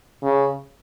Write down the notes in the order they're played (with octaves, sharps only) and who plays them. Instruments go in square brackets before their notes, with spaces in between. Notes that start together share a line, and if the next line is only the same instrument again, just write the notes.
[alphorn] C#3